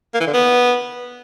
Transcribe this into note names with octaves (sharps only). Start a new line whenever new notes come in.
A#3
E3
D3
B3